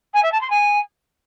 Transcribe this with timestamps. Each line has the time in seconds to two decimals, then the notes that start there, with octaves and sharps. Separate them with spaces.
0.14 G#5
0.23 E5
0.32 A5
0.41 C6
0.50 G#5